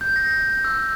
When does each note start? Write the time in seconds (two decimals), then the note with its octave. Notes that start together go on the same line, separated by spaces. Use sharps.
0.01 G6
0.16 A#6
0.64 E6